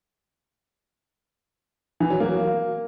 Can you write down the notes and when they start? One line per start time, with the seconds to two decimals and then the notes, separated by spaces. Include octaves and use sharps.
2.00 E3
2.10 F#3
2.20 A#3